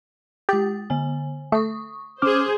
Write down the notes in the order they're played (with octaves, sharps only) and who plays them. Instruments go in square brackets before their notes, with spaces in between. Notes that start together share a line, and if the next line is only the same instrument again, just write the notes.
[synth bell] G#3 D#6 A6 [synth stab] G4
[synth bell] D3 G#5
[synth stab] A3 [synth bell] C#6 D#6
[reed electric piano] C#4 D6 F6 [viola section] G#4 C5